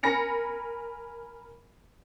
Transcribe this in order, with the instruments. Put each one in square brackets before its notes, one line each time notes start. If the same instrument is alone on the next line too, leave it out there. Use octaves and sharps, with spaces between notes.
[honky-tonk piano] A#4 G#5 B5 A#6 C#7 F7